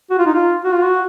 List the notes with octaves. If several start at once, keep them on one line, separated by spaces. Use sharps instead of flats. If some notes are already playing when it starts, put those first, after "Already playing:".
F#4
F4
D#4
F4
F#4
F4
F#4